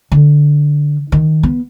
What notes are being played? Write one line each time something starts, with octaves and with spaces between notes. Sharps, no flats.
D3
D#3
B3